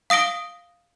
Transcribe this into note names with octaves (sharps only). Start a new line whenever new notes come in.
F5 D#6 A#6 D7 G7